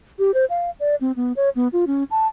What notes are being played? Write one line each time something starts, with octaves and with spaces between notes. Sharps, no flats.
G4
C5
F5
D5
C4
B3
C#5
B3
F4
C#4
A5